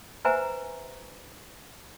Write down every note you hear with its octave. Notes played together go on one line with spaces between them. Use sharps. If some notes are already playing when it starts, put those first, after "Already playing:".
B4 C5 E5 F#5 G#5 A#5